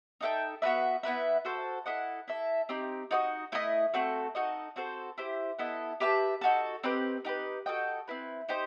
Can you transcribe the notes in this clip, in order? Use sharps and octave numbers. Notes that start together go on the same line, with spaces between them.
D#4 A4 E5 G5
B3 F#4 B4 E5
B3 E4 B4 E5
F#4 A4 C5
E4 A4 D#5 F#5
E4 A4 E5
C4 D#4 G4
D#4 F#4 B4 D#5
A3 E4 A4 D#5
A3 C4 F#4 A4
D#4 F#4 A4 D#5
C4 F#4 A4 C5
E4 G4 C5
B3 E4 A4 D#5
G4 B4 E5 A5
D#4 F#4 A4
C4 D#4 G4 B4
D#4 G4 B4
F#4 A4 D#5 G5
C4 E4 B4
D#4 G4 C5